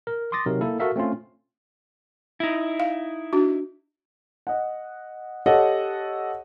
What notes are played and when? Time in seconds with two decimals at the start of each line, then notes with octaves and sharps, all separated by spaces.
0.07 A#4
0.32 C6 D6 D#6 A6 A#6
0.46 C3 F#3 D#4 A#4
0.61 A#3 E4 A4
0.79 F#4 A4 A#4 E5 F5
0.96 A3 C4 C#4 F4
2.40 D#4 E4
2.80 F5
3.33 D4 F#4
4.47 D#5 F#5
5.46 G4 A4 C#5 D#5 F#5